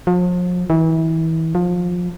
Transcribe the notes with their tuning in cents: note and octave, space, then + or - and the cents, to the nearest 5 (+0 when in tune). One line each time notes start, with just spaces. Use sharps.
F3 +40
E3 -30
F3 +25